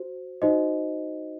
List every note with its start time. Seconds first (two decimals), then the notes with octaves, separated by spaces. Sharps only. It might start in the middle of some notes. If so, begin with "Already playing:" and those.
Already playing: F#4 C5
0.42 D#4 F#4 C5 D#5